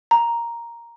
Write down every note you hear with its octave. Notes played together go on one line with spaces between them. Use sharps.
A#5